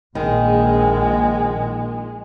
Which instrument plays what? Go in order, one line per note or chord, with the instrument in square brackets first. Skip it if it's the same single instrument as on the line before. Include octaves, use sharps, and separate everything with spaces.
[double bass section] A#1 [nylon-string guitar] D#3 [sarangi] G#3